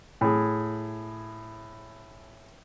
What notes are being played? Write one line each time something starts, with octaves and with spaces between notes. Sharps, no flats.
A2 G#4